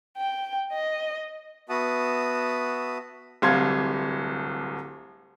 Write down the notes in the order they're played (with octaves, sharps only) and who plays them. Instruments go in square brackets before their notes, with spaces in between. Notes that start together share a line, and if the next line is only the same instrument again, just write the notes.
[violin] G5
D#5
[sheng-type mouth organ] B3 F#4 E5 F#5 A5 D#6
[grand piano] D1 C2 F5 C6 G#6